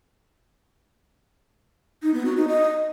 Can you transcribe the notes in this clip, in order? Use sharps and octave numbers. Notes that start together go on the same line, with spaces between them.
D#4
B3
F#4
D#4
D#5